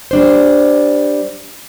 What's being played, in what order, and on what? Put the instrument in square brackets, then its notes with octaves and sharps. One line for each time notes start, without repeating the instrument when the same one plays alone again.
[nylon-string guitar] G3 D4 C5